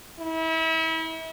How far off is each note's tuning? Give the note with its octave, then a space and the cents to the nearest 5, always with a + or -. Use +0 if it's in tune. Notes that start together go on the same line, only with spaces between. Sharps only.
E4 -35